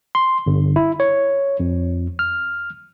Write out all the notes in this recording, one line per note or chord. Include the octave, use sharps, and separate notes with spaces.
C6
G1
E4
C#5
F2
F6